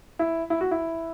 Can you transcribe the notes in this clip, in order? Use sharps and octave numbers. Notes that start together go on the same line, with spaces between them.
E4
E4
F#4
E4